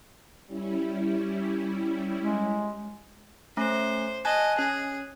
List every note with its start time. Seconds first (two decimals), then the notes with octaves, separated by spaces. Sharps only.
0.47 G3 C#4 E4
2.20 G#3
3.57 A3 C#4 C5
4.25 D#5 G#5 A5 F#6
4.59 C#4 G#4